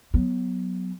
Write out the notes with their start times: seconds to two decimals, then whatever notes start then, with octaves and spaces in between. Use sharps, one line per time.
0.14 F#3 B3